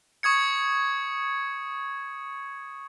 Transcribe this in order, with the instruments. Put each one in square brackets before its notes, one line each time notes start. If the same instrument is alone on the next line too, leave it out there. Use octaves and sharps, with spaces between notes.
[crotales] C#6 D#6 G#6 C#7